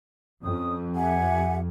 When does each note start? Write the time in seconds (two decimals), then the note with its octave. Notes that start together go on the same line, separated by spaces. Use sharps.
0.43 F2 C#4 D#6
0.96 G4 E5 F#5 G#5